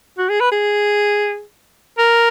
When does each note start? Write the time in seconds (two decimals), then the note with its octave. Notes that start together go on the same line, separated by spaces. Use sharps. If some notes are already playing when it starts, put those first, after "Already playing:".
0.18 F#4
0.29 G#4
0.41 B4
0.52 G#4
1.98 A#4